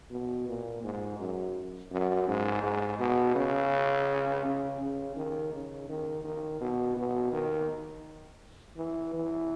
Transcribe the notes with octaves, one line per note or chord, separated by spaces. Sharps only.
B2
A#2
G#2
F#2
F#2
G#2
G#2
B2
C#3
C#3
C#3
D#3
C#3
D#3
D#3
B2
B2
D#3
E3
E3